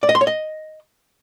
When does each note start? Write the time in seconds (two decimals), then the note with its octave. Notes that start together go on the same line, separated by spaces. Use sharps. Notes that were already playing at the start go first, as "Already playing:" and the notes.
0.03 D5
0.09 D#5
0.15 C6
0.21 C#5
0.27 D#5